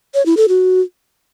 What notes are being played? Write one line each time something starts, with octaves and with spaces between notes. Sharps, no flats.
C#5
E4
A4
F#4